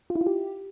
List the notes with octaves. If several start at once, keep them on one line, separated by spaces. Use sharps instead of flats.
F4
E4
F4
G4